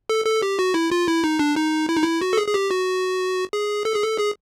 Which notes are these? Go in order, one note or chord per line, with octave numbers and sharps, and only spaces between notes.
A4
A4
G4
F#4
E4
F4
E4
D#4
D4
D#4
E4
D#4
E4
F#4
A4
G#4
G#4
G4
F#4
G#4
A4
G#4
A4
G#4